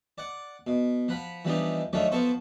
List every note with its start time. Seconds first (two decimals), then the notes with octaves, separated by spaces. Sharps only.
0.18 D5 F#5
0.67 B2
1.08 F3 F#5 B5
1.45 E3 F3 G3 B3 D4 D#4
1.93 D#3 F3 F#3 A3 C#4 D4
2.12 F3 B3 A4 C5 C#6